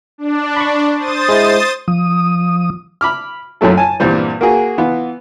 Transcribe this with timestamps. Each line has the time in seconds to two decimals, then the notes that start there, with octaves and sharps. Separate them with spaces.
0.18 D4
0.56 B5 C#6
0.98 C5 D#6 A6
1.29 G#3 E4
1.88 F3 D#6
3.01 B5 D6 F6
3.61 F#2 A2 F#3 A3 A4
3.77 G#5 A5
4.00 E2 G2 A#2 G3 C4
4.41 A#3 F#4 G#4
4.78 E3 B3 F4